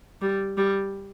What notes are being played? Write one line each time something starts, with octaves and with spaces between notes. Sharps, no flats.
G3
G3